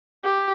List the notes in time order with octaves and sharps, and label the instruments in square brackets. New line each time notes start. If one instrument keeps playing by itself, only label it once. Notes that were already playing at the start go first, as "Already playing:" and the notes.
[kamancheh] G4